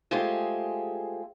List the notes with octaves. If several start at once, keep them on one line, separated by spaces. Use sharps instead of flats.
G#3 A3 F4 G4 G#4 C5